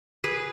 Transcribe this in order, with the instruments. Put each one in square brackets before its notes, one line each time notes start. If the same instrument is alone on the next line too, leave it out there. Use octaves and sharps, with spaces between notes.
[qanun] G#4 B4